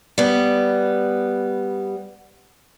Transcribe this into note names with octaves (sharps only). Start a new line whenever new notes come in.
G3 B3